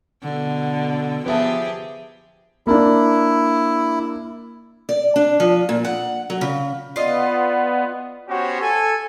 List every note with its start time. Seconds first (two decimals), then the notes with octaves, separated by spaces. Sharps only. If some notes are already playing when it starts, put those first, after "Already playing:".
0.23 B2 D3
1.26 F3 B3 G4 G#4 E5 A5
2.67 A#3 D4 E4
4.89 D5
5.16 D4
5.40 F3
5.69 A#2
5.85 F#5
6.30 F#3
6.41 C#3
6.96 B3 F4 D5 D#5
8.29 B3 C#4 F#4 G4 C5 C#5
8.62 A4 G#5